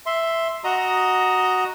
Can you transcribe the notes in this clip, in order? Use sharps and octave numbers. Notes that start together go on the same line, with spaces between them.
E5 C6
F#4 D#5 A#5 D#6